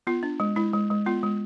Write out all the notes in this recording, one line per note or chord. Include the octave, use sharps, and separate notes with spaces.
B3 F4
D4
G#3
G#3 E4
G#3
G#3
B3 F4
G#3